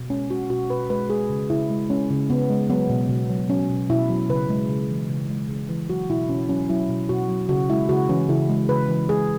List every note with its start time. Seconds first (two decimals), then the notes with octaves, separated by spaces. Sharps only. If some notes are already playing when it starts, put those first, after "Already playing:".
Already playing: B2
0.10 G#3 C#4
0.30 G#3 F#4
0.50 B2 F#4
0.70 B2 B4
0.90 G#3 B4
1.10 G#3 G#4
1.30 C#3
1.50 C#3 E4
1.70 G#3
1.89 G#3 C#4
2.10 C#3
2.30 C#3 B3
2.50 G#3
2.70 F#3 B3
2.90 B2
3.09 B2
3.30 F#3
3.50 F#3 C#4
3.70 B2
3.90 B2 E4
4.10 F#3
4.30 C#3 B4
4.50 G#3
4.69 C#3
4.90 E3
5.09 C#3
5.29 G#3
5.50 C#3
5.69 E3
5.89 F#3 F#4
6.10 B2 E4
6.29 B2 C#4
6.49 F#3 C#4
6.70 F#3 E4
6.89 B2
7.09 B2 F#4
7.29 F#3
7.49 C#3 F#4
7.69 G#3 E4
7.89 C#3 F#4
8.09 E3 C#4
8.29 C#3 E4
8.49 G#3
8.69 C#3 B4
8.89 E3
9.09 G#3 G#4